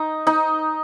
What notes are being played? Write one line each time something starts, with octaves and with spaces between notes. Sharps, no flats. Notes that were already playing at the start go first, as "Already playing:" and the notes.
Already playing: D#4
D#4